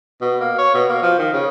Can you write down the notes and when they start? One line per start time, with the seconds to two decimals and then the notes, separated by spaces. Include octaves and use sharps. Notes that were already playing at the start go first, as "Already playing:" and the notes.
0.21 B2
0.41 A#3
0.58 C#5
0.74 B2
0.89 A#3
1.02 F3
1.19 D#3
1.33 C#3